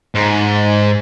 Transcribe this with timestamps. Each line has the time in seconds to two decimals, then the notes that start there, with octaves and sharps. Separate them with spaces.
0.15 G#2